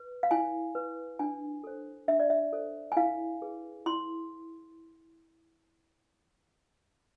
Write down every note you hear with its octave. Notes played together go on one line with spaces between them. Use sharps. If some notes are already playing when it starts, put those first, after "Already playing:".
Already playing: B4
F5
E4 G#5
B4
D4 G#5
A4 C5
D4 E5
D5
E5
A4 C5
G#5
E4 F5
G#4 B4
E4 C6